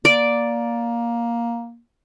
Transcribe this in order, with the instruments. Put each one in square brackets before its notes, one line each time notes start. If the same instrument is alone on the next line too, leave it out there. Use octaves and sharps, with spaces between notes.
[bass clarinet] A#3 [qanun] D5